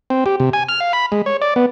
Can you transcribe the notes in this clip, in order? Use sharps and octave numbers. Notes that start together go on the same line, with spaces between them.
C4
G4
C3
G#5
F6
F5
B5
G#3
C#5
D5
B3